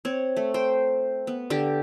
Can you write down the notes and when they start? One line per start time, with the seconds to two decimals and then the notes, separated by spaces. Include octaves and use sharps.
0.05 C4 C#5
0.37 A3
0.54 C5 G5
1.27 B3
1.50 D3 G4 G5